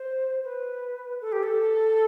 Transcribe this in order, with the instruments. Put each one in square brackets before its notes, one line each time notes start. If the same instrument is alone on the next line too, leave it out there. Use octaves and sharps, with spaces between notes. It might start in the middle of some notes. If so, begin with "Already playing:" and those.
Already playing: [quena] C5
B4
A4
G4
A4